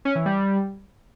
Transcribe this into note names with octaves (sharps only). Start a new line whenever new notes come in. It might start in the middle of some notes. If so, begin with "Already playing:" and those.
C#4
E3
G3